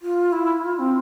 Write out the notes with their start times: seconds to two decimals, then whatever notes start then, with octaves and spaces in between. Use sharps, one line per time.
0.02 F4
0.33 E4
0.64 F4
0.79 C4